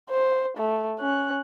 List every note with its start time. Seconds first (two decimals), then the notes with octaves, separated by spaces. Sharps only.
0.10 C5
0.58 A3
1.00 C#4 F#6